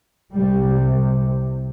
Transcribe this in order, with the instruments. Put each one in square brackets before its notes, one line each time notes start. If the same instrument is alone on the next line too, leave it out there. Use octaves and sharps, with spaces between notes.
[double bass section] C2 C3 G3